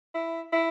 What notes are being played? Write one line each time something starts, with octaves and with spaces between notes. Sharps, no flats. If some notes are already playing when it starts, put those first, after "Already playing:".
E4
E4